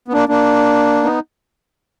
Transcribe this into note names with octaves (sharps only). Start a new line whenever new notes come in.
B3
A#3 D4
A#3 D4
B3 D#4